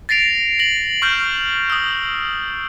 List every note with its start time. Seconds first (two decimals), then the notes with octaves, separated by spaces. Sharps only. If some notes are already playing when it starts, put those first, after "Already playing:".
0.09 A6 A#6 C7 D7 F7
0.59 A#6 F#7
1.02 C#6 F6 G6
1.70 D#6 E6